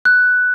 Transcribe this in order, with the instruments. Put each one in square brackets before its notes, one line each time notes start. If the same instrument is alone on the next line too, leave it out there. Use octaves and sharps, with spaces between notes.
[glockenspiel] F#6